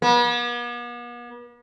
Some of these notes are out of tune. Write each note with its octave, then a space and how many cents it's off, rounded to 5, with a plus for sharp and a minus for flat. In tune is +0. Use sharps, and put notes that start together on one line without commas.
B3 -45